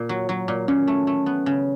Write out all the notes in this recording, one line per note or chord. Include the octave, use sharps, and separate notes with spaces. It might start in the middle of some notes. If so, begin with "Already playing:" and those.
Already playing: A#2
F#3
F#3
A#2
A#2 C#4
A3
A3
B3
C#3